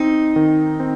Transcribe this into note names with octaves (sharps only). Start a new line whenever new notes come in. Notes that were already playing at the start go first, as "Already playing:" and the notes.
Already playing: C4 D#4
D#3
C4